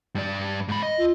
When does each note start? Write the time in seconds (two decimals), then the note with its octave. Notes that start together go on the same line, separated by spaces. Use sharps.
0.15 G2 D5
0.68 G#2 B5
0.83 D#5
0.98 F4